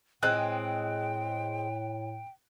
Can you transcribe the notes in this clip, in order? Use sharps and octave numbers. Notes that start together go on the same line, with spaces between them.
A2 G#3 C4 G5 F#6